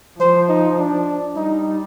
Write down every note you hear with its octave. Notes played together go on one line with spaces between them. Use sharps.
F3 C5
D#4
D4
G3 D#4